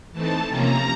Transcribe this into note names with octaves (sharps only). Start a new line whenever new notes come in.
E3 A3 C4 D#4 A5
C3 F3 A#3 C#4 A#5